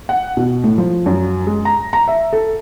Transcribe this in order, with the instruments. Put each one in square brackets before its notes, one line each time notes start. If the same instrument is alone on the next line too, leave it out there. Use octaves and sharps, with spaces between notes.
[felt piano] F#5
B2
A2
F3
F#2
G#3
A#5
A#5
E5
A4